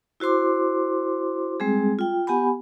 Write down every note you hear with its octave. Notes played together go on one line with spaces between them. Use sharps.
E4 F#4 C5 C6 D6
G3 G#3 C4 G#4
F4 G5
B3 G4 F#5 G#5 B5